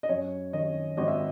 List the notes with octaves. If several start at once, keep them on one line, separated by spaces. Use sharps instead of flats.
D#5
F#2 C#5
D#3 D#5
G#1 D#5
E5